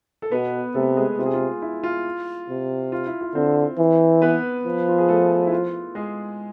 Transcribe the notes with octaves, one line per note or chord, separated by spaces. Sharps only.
A4
B2 B3 B4
C3 A3 A4
G#3 G#4
C3 F4
G#4
F4
E4
F4
C3
F4
E4
F4
D3 C4 C5
E3
B3 B4
F3
F4
G#4
A3 A4
E4
F4
G#3 G#4